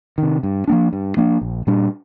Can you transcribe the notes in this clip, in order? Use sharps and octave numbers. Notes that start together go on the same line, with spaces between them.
C3 D#3
G2
F3 A#3 D4
G2
F3 A#3 D4
A#1
A#2 G3 D4